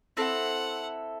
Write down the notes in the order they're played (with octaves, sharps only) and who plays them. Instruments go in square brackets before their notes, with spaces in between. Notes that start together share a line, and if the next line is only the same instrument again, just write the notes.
[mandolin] C4 E4 A4 [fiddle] F#5